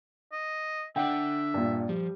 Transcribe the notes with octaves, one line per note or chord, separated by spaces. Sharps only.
D#5
D3 D4 D5 E5 F#5 G5
G2 A#2
F3 G3